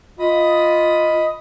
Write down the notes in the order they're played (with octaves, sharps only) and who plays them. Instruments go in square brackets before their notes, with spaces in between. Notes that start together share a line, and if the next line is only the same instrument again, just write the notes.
[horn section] F4 [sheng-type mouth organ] D#5 B5 D#6